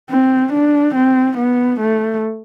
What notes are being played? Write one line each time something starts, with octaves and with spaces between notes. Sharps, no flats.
C4
D4
C4
B3
A3